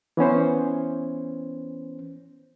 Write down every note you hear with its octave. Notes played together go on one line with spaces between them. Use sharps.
E3 B3 C#4 C5